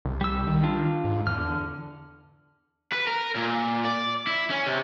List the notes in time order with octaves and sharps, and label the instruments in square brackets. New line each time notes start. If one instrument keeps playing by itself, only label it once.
[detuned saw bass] C2
[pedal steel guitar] G3 E6
[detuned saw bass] D#3
[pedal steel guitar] D4 F4
[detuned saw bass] G#2
[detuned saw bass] E2 [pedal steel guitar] D3 F6
[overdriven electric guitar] B4
A#4
A#2
D5
E4
C#4
C3